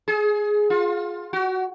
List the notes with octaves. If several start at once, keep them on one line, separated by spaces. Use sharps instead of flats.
G#4
F4
F#4